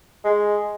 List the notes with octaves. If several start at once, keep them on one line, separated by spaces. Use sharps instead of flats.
G#3